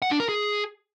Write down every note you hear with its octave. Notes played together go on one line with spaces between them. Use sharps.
F#5
D4
A#4
G#4